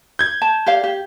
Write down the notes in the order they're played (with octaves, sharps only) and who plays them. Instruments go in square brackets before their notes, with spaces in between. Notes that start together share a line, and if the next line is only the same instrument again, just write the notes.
[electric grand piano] G6 G#6
[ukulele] A5
G4 D5 F5
G4